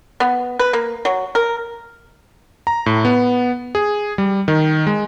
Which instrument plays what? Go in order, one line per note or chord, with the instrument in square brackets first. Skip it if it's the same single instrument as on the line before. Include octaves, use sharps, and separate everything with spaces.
[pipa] B3
B4
A#3
F#3
A#4
[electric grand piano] A#5
A2
B3
G#4
G3
D#3
G#3